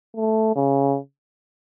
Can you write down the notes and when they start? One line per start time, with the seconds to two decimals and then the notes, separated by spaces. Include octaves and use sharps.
0.16 A3
0.56 C#3